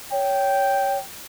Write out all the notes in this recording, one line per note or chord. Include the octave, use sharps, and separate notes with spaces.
C#5 G5